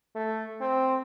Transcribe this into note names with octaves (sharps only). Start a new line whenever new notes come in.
A3
C4